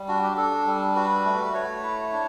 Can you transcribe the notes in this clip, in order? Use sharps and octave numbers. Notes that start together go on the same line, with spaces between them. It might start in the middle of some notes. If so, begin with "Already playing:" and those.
Already playing: G3
D4 F#4
G4
D4 A4
G3
F#4 B4
A3
B4
A3 C#5
E4
D4